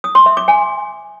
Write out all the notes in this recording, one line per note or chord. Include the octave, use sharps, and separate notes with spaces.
D#6
C6
E5
D6
G#5